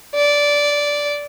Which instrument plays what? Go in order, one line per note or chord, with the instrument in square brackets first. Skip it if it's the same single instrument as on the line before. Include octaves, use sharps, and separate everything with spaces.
[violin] D5